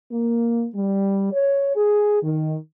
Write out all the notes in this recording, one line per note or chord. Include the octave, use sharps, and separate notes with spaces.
A#3
G3
C#5
G#4
D#3